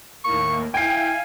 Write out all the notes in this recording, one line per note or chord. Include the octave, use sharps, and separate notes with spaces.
D#2 A2 A#3 C#6
E4 F5 G5 G#5 C7